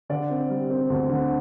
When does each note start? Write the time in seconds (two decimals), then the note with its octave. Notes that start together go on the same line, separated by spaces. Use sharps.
0.09 D3 D5
0.30 C4
0.50 G3
0.70 C4
0.90 D2
1.10 D3